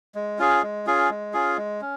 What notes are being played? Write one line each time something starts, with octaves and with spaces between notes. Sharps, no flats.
G#3
C#4 F4 G#4
G#3
C#4 F4 G#4
G#3
C#4 F4 G#4
G#3
C#4